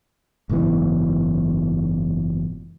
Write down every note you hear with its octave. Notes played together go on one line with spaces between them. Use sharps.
F#1 G#2 B2 E3